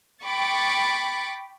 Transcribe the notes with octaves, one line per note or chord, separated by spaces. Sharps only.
G5 B5 C#6 D6 A6